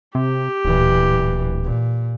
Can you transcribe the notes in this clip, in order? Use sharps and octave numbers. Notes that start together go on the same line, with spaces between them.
C3 G4
D1 A#2 E3
A#2